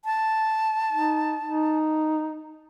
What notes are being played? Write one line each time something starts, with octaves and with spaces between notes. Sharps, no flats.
A5
D#4
D#4